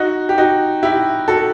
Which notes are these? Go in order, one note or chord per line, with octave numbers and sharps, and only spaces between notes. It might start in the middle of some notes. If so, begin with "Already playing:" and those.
Already playing: D#4 F#4
G4
D#4 F#4
E4 G4
F#4 A4